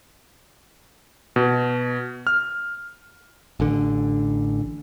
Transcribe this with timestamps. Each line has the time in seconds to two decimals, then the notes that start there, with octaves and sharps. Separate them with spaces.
1.36 B2
2.27 F6
3.60 A1 D3